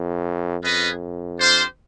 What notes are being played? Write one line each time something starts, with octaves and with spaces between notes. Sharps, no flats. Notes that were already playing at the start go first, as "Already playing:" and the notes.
Already playing: F2
F2 C#4 F4 G#4 B4 D#5
D4 G4 C5 F5